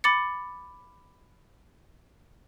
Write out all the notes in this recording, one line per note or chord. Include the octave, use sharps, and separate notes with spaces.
B5 D6 A6 C#7